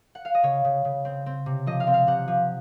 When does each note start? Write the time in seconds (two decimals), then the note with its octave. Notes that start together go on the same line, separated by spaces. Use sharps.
0.15 F#5
0.25 F5
0.35 D#5
0.43 C#3 C#5
0.65 C#3
0.85 C#3
1.05 C4
1.26 C4
1.46 C3
1.66 F3 D#5
1.80 F5
1.87 C4
1.94 F5
2.07 C3 F#5
2.28 F3